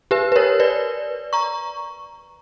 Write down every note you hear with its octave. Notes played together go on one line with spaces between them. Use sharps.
G4 B4
B4
A#4 C#5
B4 D5
A#5 C#6